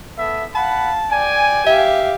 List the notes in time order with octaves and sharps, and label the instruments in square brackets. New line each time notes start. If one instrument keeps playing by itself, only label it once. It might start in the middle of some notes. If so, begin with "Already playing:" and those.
[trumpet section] B3 A4 E5
[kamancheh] F5 [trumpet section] F#5 B5 [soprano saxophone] A5
[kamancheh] D5 [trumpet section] G5 G#5
[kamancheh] G4 F5 [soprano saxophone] E5